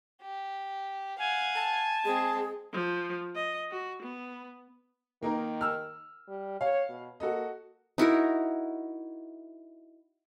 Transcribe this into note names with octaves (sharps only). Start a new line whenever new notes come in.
G4
F5 F#5 G#5
A5
G#3 C4 G#4
F3
D#5
F#4
B3
D#3 A#3 D#4 A#4
E6 F6
G3
C#5 F5
B2
A#3 F#4 A4 D#5
D#4 E4 F#4 A#4